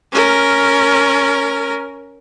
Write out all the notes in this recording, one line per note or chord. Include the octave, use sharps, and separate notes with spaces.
C#4 A#4